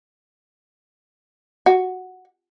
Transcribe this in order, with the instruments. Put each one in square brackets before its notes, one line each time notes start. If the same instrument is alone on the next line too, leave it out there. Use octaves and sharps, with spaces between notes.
[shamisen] F#4